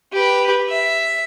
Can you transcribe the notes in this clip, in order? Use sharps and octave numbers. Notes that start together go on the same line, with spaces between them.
G4 B4
E5